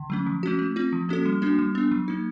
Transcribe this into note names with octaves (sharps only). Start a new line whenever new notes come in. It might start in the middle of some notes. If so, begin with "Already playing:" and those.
Already playing: D3
F#3 A3 C#4
F3
A3 C#4 F#4
A3
C4 F4
F3
A#3 C#4 F#4 A4
G3
A#3 D4 F#4
G3
B3 D4
F#3
A#3 D#4